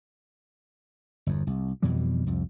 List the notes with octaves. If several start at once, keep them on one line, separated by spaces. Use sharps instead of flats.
G1 E2
C2
F2 B2 E3 G3
C2 F2